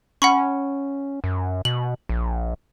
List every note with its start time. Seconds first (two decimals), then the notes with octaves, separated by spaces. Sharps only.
0.22 C#4 F#5 B5 C#6
1.24 F#2
1.65 B2 F#7
2.09 A#1